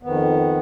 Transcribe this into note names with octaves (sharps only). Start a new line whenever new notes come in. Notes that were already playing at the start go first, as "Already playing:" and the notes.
F2 D#3 B3